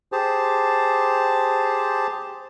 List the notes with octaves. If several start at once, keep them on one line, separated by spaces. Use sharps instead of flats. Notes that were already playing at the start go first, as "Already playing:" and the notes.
G4 G#4 C5 A5